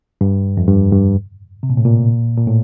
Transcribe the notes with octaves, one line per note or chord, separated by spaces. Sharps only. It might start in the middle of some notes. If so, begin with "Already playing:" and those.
G2
F2
G2
G2
C3
A#2
A2
A#2
A#2
A2